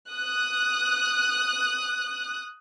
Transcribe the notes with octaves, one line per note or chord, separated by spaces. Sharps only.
D#6 F#6